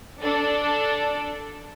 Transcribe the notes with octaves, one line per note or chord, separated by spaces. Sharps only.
D4 A4